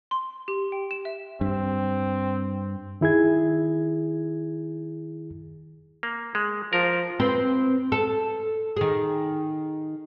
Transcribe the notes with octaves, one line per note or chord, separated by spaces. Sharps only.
C6
G4
G5
E7
E5
G2 C4
D#3 E4 G#4 G#6
A#3
G#3
F3 A#4
C4 B4
A4
D#3 G#4